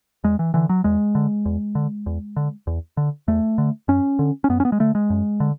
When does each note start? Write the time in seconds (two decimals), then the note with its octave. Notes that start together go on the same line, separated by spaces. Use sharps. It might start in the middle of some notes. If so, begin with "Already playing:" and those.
0.24 E2 G#3
0.39 E3
0.54 D3 E3
0.69 F#3
0.84 E2 G#3
1.15 D3
1.46 E2
1.75 D3
2.06 E2
2.37 D3
2.67 E2
2.97 D3
3.28 E2 A3
3.58 D3
3.88 F#2 C#4
4.19 D3
4.44 C#4
4.49 F#2 B3
4.60 C#4
4.65 B3
4.72 G#3
4.80 D3 A3
4.95 G#3
5.10 F#2
5.40 D3